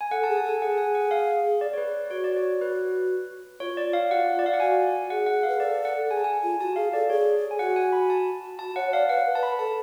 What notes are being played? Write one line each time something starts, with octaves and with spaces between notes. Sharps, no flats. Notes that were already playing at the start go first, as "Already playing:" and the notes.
G#5
A4 F#5
A5
G#4
A5
A4 G#5
G#4 F#5
G#5
F#5
F5
D5
C#5
B4
F#4 C#5
D5
C#5
B4
F4 C#5
D5
F5
F4 F#4 F#5
D5
F5
F#5
F#4 G#5
G#4 F#5
F#5
F5
B4
A4 D5
F#5
G#4 G#5
A5
G#5
F4
F#4 A5
G#4 F5
A4 D5
G#4 C#5
G#5
F#4 F#5
G#5
B5
A5
F#4 A5
C#5 F#5
D5 F5
B4 F#5
B4 A5
B5
A4 A5